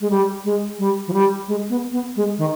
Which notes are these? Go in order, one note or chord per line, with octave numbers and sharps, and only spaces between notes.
G#3
G3
G#3
G3
F3
G3
G#3
B3
B3
G#3
D#3